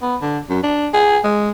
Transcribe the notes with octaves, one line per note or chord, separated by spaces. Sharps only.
B3
D3
F#2
D4
G#4
G#3